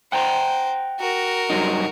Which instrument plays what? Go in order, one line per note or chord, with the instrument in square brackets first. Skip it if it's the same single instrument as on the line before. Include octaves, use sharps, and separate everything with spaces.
[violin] C5 [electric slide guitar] F#5 G5 A#5
[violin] F#4 A#4
[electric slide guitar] G2 F#3 D#4